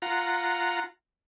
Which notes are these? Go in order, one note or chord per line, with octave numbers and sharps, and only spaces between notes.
F4 F#5 A#5